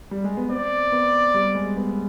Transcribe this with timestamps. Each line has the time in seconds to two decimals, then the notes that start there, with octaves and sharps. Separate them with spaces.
0.11 G3
0.24 G#3
0.37 B3
0.50 C4 D5
0.92 B3
1.34 G3
1.55 G#3
1.77 B3